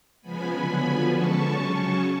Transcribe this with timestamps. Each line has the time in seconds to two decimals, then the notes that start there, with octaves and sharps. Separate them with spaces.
0.22 C#3 F3 G#3 B3 G#5 B5
0.51 D3 F#3 B3 G#5 B5
0.81 D3 F3 B3
1.11 D3 G#3 C#4 A5 C#6
1.41 C#3 F#3 C#4
1.70 C#3 F#3 C#4 A5 C#6